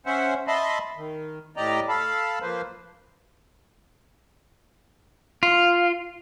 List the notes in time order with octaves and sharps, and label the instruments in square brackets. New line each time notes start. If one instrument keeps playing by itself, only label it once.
[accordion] C#4 C5 E5 F#5
D#5 E5 A5 B5 C6
D#3
A2 G4 D5 D#5 A#5
A4 F5 A5 B5
F3 A#3 B4 C5
[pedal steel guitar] F4